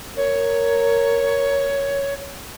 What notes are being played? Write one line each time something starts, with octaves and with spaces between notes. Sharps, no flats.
A#4 C#5